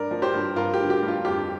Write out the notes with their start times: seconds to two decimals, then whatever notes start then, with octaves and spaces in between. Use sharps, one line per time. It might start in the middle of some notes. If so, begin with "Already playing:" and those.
Already playing: G2 A#4 D5
0.11 F3
0.22 G4 C5
0.34 G2
0.56 G2 F4 A#4
0.74 G4
0.79 D3
0.90 G4
1.02 G2
1.08 F4
1.25 F2 G4